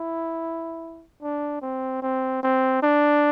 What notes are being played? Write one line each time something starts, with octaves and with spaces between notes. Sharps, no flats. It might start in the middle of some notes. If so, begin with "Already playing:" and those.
Already playing: E4
D4
C4
C4
C4
D4